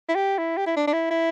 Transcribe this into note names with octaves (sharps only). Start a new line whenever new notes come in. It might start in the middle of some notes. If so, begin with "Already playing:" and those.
E4
G4
E4
G4
E4
D4
D4
E4
E4